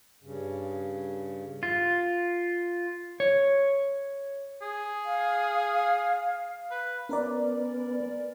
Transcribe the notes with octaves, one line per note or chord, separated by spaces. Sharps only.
G2 C#3
F4
C#5
G#4
F5
B4
B3 C#4 A#4 D5